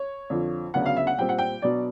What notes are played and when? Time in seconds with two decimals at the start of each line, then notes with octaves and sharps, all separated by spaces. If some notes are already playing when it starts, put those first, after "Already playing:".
Already playing: C#5
0.30 F2 D3 F3
0.74 D2 C#3 F#3 B3 D4 F#5
0.86 F5
0.97 E5
1.07 F#5
1.18 A#2 G3 C4 G5
1.29 F#5
1.38 G5
1.62 B2 F#3 B3 D4 D5